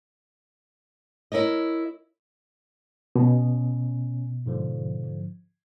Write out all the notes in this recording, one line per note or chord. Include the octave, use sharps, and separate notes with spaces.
E4 A#4 C#5 D#5
B2 C#4
G#2 D3 F3